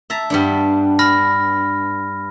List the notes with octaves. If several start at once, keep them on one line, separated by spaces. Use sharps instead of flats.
E5 A5 A#5
G2 B3 D4
B5 F6 A#6